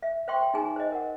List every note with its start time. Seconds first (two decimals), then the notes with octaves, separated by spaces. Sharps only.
0.02 E5
0.28 C5 E5 G5 C6 C#6
0.54 D#4 G#4 G#5 A#5
0.76 C5 D#5
0.92 A#4 F#5